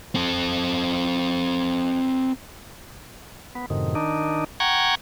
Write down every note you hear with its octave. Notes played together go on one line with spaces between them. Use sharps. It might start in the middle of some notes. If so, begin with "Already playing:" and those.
C4 A4
B3
F#2 A2 C3 D#3
D#3 D4 D#4
F#5 G5 A#5 C#6 G#6